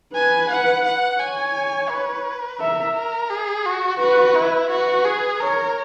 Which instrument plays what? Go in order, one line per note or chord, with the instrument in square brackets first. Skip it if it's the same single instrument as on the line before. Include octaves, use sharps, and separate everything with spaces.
[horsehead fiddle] B4 [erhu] G#5
[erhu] F#5
F#5
[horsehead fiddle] C#5 [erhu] G#5
[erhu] B4
[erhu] A#4 [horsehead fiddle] E5
[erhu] A#4
G#4
F#4
[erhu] F#4 [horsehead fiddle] B4
[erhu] E4
[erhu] F#4 [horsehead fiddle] B4
[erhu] G#4
[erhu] A#4 [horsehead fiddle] C#5